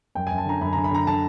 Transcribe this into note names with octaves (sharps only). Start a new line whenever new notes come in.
F#2 G5
F#2 G#5
A5
D3 A#5
F#2 B5
D3 A#5
B5
D3 A#5
D3 A5